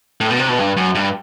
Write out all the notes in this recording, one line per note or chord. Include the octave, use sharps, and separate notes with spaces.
A2
B2
C3
B2
G2
F#2
G2